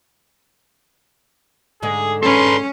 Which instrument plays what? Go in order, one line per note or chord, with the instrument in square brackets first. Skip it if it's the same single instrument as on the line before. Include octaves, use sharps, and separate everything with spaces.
[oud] G#2 D3 G#3 [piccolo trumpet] G#4
[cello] C#4 [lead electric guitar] A4 B4 [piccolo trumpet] C6